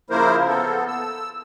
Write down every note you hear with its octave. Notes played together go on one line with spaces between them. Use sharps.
C#3 F3 A#3 E4 A#4 C5
B3 A4
E6